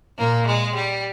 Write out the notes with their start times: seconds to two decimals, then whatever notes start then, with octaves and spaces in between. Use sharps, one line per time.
0.19 A#2 A#3
0.47 G#3
0.76 G3